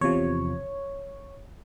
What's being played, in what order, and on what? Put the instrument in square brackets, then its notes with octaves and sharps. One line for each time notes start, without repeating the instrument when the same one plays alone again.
[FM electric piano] E2 C3 F3 C#5